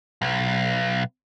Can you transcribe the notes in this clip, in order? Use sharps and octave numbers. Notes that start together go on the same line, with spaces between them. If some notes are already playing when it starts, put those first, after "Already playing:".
B1